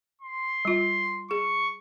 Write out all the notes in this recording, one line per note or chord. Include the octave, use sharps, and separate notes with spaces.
C6
G3 F4
G#4 C#6